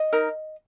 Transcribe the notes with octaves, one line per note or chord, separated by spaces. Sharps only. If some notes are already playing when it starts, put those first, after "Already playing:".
Already playing: D#5
D#4 A#4